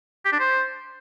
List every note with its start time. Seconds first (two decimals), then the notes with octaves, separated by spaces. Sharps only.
0.25 G4
0.32 D4
0.39 C5